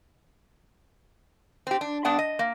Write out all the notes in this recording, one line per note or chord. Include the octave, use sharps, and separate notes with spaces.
C4 G4
D4
G2 B3 D4 F#5
D#5
A#3